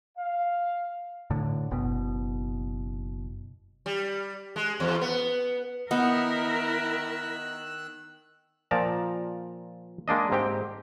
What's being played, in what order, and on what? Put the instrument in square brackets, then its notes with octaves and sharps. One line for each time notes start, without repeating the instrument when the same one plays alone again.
[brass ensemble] F5
[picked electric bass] A2 D3
F#1 B2
[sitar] G3
G#3
E2
B3
[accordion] D#3 E6 F#6 [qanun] B3 [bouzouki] D#4 F#5 [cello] E4 A#4
[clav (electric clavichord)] A#2 F3 D5 A5 A#5
G#3 A#3 D4 D#5
G#2 C4 G4 G5